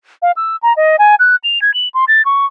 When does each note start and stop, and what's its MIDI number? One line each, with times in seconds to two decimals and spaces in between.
0.22 0.32 77
0.36 0.56 88
0.63 0.76 82
0.76 0.96 75
0.99 1.15 80
1.19 1.36 90
1.44 1.61 101
1.62 1.73 92
1.74 1.88 102
1.94 2.05 84
2.08 2.24 93
2.25 2.46 85